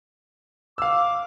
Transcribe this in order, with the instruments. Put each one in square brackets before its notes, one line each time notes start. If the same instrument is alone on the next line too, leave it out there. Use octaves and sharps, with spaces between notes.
[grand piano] F5 E6 [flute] D6